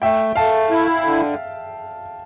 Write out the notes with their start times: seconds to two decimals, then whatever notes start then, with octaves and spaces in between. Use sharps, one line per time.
0.02 A3 E5 G5
0.36 A3 F5 A5
0.70 E4
1.04 D3